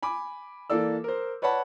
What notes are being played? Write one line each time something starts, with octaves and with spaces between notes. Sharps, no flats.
G#5 B5 D6
E3 A#3 A4 D5 E6
A#4 C5
B4 C#5 D5 F#5 A5 B5